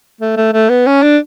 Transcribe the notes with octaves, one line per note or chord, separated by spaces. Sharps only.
A3
A3
A3
B3
C#4
D4